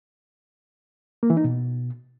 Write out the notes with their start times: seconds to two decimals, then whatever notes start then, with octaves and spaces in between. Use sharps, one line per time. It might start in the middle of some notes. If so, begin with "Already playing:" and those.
1.23 A#3
1.30 E3
1.37 D#4
1.44 B2